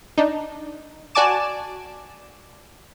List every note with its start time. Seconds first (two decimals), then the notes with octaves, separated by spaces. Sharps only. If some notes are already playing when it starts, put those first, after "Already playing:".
0.18 D4 D#4
1.15 F#4 D5 G#5 A5 D6 E7